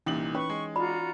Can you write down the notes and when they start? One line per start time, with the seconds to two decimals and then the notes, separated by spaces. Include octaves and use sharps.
0.06 C2 A#2 E3 C#4 D#4 F#7
0.35 C#4 B4 C#5 C#6
0.50 G#3
0.76 F4 F#4 D5 A#5 B5